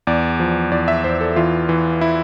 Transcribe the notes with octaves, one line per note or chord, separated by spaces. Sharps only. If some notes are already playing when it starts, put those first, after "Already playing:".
E2 D5
F3
E2 D5
E5
E2 C5
A4
E3 F4
E3
E4